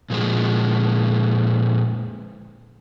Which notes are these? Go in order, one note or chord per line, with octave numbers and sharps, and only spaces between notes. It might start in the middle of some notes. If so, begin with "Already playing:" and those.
A#2 F3 G#3